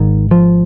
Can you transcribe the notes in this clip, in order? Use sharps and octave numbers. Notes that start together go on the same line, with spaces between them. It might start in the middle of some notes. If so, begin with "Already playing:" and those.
Already playing: G#1 G#2 D#3
F3